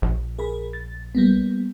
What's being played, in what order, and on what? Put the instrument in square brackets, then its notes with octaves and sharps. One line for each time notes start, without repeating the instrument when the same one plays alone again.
[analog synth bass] A#1
[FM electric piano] G#4 A#4 B5
A6
G3 A#3 B3